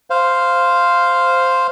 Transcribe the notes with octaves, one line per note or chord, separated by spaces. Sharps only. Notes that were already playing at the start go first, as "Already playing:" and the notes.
C5 F5